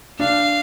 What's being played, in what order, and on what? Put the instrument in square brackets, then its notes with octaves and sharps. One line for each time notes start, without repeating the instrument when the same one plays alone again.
[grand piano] D4 [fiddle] F5